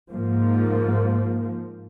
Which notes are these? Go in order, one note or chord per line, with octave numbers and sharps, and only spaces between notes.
G#2 F3 A#3